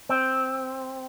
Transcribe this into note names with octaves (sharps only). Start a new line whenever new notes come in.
C4